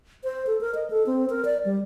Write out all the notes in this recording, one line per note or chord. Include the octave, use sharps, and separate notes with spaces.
C5
A4
A#4
D#5
A4
C4
A#4
D5
G3